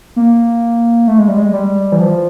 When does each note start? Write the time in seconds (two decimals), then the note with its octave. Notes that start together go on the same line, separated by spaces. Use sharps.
0.16 A#3
1.08 A3
1.18 G#3
1.28 G3
1.37 G#3
1.53 G3
1.92 E3
1.99 F3